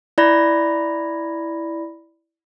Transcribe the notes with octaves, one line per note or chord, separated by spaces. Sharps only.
E4 D5 B5 A#6